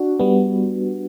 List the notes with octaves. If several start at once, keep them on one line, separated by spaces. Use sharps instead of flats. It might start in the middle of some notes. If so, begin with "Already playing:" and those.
Already playing: D4 F#4
G3 B3